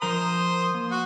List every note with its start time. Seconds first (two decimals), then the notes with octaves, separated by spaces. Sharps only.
0.02 F3 A#4 C5 A#5 C6 D#6
0.74 A#3
0.91 F#4 F#5